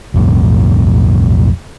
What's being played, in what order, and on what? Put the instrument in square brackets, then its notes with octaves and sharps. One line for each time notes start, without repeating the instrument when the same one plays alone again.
[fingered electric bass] B1 F2 A2